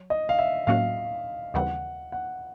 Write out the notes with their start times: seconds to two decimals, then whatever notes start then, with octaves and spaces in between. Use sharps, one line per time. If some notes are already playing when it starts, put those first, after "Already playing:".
Already playing: F#3
0.10 D#5
0.29 F5
0.39 E5
0.67 A2 F#3 A#3 C#4 F#4 F5
1.54 D#2 C#3 E3 G3 C4 F#5
2.12 F#5